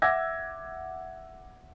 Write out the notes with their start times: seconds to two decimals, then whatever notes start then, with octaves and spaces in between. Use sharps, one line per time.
0.02 E5 F#5 D6 E6 G#6 A#6